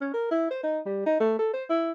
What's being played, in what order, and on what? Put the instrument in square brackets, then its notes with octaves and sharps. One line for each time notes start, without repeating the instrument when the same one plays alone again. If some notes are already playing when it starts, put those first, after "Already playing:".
[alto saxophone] C#4
A#4
E4
C5
D#4
G3
D#4
A3
A4
C5
E4